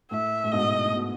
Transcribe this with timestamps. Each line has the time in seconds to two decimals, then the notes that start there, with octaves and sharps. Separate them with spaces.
0.11 A2 E5
0.44 A2
0.52 G#2 B2 D#5
0.85 A2
0.94 B2